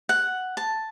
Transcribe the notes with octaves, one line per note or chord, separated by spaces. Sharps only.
F#5
A5